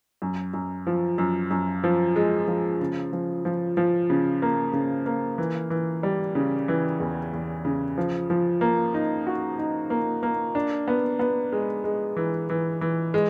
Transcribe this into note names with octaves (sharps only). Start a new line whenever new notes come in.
F#2
F#2
F3
F#2
F#2
F3
G#3
F3
C#3
F3
F3
F3
C#3
A#3
C#3
A#3
E3
E3
G3
C#3
E3
E2
E2
C#3
F3
F3
A#3
D#4
F#4
D#4
A#3
A#3
D4
B3
B3
G#3
G#3
E3
E3
E3
G#3